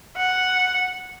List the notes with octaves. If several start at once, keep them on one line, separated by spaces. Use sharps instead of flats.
F#5